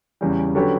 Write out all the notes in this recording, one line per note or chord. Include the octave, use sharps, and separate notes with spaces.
E2 C#3 G3
D3 F#3 C#4 G4 B4